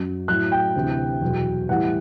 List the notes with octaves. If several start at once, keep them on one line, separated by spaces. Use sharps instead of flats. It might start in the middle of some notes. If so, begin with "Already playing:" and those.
Already playing: F#2 F#3
A2 F#3 F#6
G5
D2 C3 E3
E2 B2 F#3
A2 E3 G3 F#5